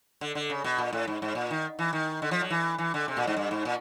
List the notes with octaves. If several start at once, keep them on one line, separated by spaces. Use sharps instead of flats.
D3
D3
C#3
B2
A#2
A2
G#2
G#2
A#2
D#3
E3
D#3
D3
F3
F#3
E3
E3
D3
C3
A#2
G#2
G2
G#2
A#2